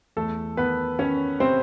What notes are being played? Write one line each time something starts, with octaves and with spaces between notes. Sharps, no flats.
E2 A3 A4
D#3 B3 B4
D#3 C#4 C#5
C3 C4 C5